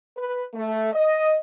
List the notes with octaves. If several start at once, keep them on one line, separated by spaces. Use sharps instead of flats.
B4
A3
D#5